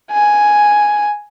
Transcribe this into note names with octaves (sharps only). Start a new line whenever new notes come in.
G#5